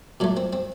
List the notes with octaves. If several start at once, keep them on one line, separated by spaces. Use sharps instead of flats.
A#2 F#3 A3 D4
C4
C4